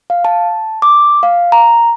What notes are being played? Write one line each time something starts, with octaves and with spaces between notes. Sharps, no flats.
F5
A5
D6
F5
A#5